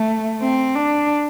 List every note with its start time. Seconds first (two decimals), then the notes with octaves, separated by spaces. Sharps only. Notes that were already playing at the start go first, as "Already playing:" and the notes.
Already playing: A3
0.42 C4
0.75 D4